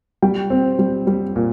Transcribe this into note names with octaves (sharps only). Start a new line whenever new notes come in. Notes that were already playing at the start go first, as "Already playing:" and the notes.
G3 G5
C4
G3
G3
A#2